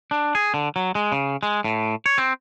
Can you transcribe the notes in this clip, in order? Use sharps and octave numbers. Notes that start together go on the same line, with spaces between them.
D4
G#4
D3
F#3
G#3
C#3
G#3
A2
C#5
C4